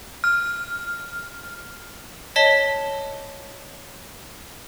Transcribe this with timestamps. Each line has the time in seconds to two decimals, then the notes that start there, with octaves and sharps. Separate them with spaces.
0.24 F6
2.36 C#5 D#5 A5 A#6 B6 G7